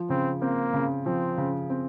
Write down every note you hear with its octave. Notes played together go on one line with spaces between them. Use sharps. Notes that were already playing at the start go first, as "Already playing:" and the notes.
Already playing: F3
C#3 C4
A#3 C4
C#3
F3 C4
C#3
C4